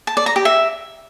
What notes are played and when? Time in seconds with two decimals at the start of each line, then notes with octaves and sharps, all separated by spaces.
0.07 A5
0.17 D5
0.26 A#5
0.36 G4
0.45 E5